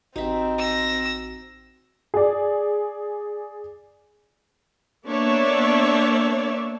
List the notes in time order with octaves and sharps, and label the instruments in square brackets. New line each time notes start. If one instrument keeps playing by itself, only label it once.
[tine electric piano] A1 F#4 [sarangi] C4 [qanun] D#4 E5
[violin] E6 A#6
[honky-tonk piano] G#4 D5
[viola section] A#3 B3 D4 C#5 D5 E5